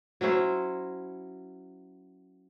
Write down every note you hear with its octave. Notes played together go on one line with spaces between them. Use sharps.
F#3 C#4 E4 C5